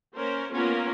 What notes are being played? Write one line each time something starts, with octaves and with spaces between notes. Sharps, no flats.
A#3 C#4 A#4 C5
A#3 B3 C#4 F4 A#4